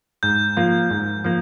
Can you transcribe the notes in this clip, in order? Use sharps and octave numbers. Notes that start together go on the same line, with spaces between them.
G#2 G6
F3 A#3 F4
G#2
F3 A#3